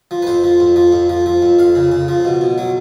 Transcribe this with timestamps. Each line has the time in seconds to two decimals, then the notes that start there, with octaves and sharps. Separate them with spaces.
0.11 F3
0.22 B4
0.27 F2 C5
0.44 F3
0.60 F2
0.76 F3
0.93 F2
1.09 F3
1.26 F3
1.42 F2
1.59 F2 F5
1.75 C#3
1.92 C#3
2.08 F3
2.25 B2
2.41 B2
2.58 F#3